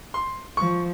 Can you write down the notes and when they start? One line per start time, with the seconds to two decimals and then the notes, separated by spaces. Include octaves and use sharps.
0.14 C6
0.57 F3 C#6